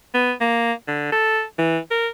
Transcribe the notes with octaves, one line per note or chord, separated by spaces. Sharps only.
B3
A#3
D3
A4
E3
A#4